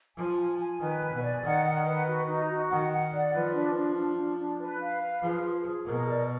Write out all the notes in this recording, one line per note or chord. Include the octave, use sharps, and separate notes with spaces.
F3 G#5
G#5
G#5
D#3 B4
G#5
B2
D5
D#3 F#5
F#5
B4
F#4
D#4
F#4
D#3 F#5
F#5
D5
F3 B4
D4
D4
D4
D4
D4
B4
F5
B4
F3 G#4
G#4
G#4
B2 A#4
D5